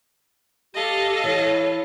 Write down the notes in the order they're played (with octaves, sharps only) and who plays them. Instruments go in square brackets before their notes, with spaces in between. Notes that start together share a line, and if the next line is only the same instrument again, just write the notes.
[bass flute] G4 [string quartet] A4 D#5 F5
[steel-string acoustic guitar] E3 [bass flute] C#5